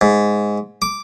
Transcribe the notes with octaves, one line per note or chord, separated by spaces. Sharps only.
G#2
D6